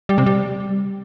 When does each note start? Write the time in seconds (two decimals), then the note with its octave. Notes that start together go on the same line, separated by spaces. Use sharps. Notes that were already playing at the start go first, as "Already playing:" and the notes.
0.09 G3
0.18 C3
0.26 G3